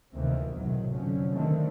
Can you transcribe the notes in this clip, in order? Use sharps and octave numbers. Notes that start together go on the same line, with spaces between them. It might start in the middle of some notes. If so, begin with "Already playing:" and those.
D2 C3 D#3 E3 A#3 C4
B1 E2 A2 C3 D#3 F#3
F1 F2 D3 F3 F#3 C#4
D3 D#3 G3 A3 C4